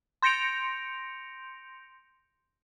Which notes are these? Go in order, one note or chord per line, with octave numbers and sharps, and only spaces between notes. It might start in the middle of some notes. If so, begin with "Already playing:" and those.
C6 G6 A#6 C#7 D7 F7